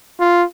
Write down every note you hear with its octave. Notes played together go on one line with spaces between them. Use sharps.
F4